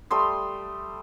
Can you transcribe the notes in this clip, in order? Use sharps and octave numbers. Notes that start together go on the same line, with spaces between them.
G3 A3 C6 D#6